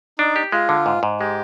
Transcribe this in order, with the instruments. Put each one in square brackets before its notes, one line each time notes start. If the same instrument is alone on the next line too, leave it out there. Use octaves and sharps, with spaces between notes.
[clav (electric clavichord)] D4 [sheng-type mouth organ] D#4
[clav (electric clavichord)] G4
[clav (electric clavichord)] G#3 [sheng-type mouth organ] F4
[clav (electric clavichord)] D3
G#2
G#2
[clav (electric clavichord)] G#3 [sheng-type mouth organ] G4